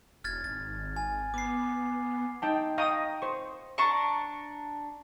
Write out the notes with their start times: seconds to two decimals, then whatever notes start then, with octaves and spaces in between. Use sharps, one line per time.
0.24 E1 F6 G#6 A6
0.44 G#1 A6
0.96 G#5
1.34 B3 D6 C7
2.42 D#4 G5 A5
2.78 D#5 F5 G5 A#5 C#6 D#6
3.22 C5 C#6
3.78 D4 A5 A#5 C#6